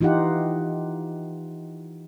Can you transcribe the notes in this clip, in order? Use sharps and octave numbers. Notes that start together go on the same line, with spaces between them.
E3 D#4 F4 G4 F#5